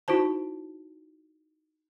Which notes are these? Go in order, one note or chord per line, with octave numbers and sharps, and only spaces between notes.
D#4 E4 F#4 C5 A5